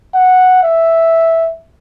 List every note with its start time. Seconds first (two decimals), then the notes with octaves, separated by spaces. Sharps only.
0.15 F#5
0.63 E5